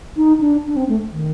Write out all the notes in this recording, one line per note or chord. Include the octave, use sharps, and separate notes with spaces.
D#4
D4
D4
C4
A3
D#3